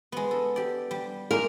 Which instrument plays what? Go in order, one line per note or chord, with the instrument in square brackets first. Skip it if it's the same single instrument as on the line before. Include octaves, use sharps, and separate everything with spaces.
[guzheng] G#3 B3
A4
G4 D5
G3
[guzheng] G#3 A#3 [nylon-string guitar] A#4